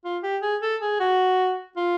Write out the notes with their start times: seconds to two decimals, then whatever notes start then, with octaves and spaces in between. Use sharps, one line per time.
0.04 F4
0.23 G4
0.42 G#4
0.62 A4
0.82 G#4
1.00 F#4
1.76 F4